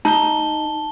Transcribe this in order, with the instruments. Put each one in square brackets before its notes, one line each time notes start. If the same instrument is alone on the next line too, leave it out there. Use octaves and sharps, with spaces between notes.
[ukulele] D#4 [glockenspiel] A5 G7